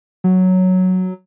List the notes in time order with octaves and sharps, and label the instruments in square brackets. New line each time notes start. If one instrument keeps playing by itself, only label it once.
[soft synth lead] F#3